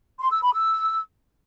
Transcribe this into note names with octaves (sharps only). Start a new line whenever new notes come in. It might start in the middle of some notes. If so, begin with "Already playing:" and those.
C6
E6
B5
E6